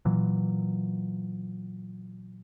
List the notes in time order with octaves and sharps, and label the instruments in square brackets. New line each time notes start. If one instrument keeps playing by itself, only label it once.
[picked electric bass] A#2 E3 F#3